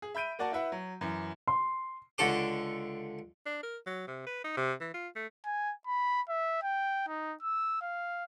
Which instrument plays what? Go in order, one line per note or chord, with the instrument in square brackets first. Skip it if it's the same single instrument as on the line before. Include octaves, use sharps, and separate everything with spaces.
[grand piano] G#4
E5 B5 G6 D7 D#7
A#3 F#4 D5 F#5 A5
E4 B4 E5 F#5
F#3
F#2 E3
C6
[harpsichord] C#2 D3 A4 D6
[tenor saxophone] D4
A#4
F#3
C3
B4
D#4
C3
E3
F4
A3
[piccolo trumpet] G#5
B5
E5
G5
D#4
E6
F5